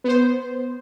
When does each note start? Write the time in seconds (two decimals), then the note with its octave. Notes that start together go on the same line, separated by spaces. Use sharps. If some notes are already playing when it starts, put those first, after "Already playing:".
0.04 B3 C5